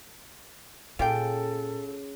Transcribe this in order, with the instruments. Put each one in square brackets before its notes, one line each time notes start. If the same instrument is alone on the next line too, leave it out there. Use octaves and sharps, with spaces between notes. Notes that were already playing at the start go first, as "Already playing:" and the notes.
[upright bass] A#2 [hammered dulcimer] C#3 [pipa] F4 G4 G5 [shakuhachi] A4